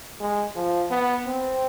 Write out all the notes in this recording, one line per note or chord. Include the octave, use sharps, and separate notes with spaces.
G#3
F3
B3
C4